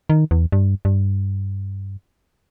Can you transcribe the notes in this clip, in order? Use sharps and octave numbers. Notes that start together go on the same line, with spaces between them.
D#3
E2
G2
G2